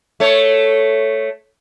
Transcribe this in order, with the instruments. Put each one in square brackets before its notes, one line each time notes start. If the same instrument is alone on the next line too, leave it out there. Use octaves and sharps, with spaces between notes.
[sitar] A3 C#5